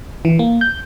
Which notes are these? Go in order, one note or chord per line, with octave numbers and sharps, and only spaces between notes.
E3
A#3
G6